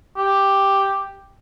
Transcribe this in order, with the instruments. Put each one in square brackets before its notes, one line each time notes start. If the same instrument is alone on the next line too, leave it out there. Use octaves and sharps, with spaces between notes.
[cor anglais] G4